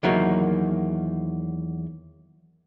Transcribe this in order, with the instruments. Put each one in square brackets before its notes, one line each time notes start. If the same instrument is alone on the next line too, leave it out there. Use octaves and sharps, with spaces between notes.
[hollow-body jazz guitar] E2 D#3 F#3 A#3